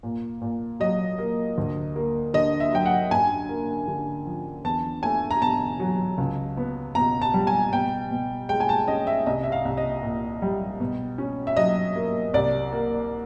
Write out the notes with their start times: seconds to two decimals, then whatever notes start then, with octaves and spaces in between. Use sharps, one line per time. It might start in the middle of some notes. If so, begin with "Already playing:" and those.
0.03 A#2
0.42 A#2
0.80 F#3 D#5
1.18 A#3
1.58 D2
1.96 A#3
2.34 D3 D#5
2.60 E5
2.73 F#3 G5
2.86 F#5
3.11 F#2 G#5
3.49 A#3
3.88 D3
4.26 F3
4.64 E2 A5
5.03 A3 G#5
5.31 A#5
5.42 B2 A5
5.80 F#3
6.18 C#2
6.57 B3
6.95 B2 A#5
7.22 A5
7.34 G3
7.47 G#5
7.73 B2 G5
8.11 B2
8.49 G#3 G5
8.60 G#5
8.69 A5
8.88 C#4 D#5
9.07 E5
9.26 C2 D#5
9.43 E5
9.52 F5
9.65 C2
9.77 D#5
10.03 A#2
10.42 G3
10.80 B2
11.18 C#4
11.47 E5
11.57 F#3 D#5
11.96 A#3
12.34 C2 D5
12.73 A#3